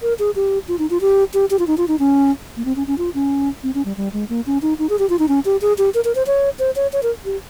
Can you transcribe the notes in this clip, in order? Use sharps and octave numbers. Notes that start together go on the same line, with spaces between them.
A#4
G#4
G4
F4
D#4
F4
G4
G4
G4
F4
D#4
F4
D#4
C#4
A#3
C4
C#4
C#4
F4
C#4
C4
C#4
G3
G3
G#3
A#3
C#4
D#4
D#4
G#4
G4
F4
D#4
C#4
G4
G#4
G4
A#4
A#4
C5
C#5
C5
C#5
C#5
A#4
G4